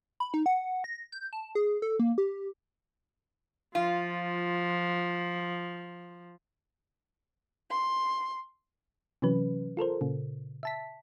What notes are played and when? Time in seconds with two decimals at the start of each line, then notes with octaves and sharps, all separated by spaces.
0.20 B5
0.34 D#4
0.46 F#5
0.84 A#6
1.12 G6
1.33 A5
1.55 G#4
1.82 A4
1.99 A#3
2.18 G4
3.75 F3 F4
7.70 C6
9.22 C3 E3 F#3 C#4 B4
9.77 F4 A4 A#4 C5
10.01 A#2 C#3
10.63 E5 A5 B6